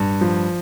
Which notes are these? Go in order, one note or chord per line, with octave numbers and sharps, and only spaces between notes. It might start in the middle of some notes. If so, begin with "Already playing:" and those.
Already playing: G2
F3